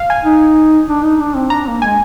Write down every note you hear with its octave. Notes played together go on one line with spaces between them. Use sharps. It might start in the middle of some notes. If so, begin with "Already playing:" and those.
Already playing: F5
G#5
D#4
D4
D#4
D4
C4
D4 A#5
A#3
G#3 G#5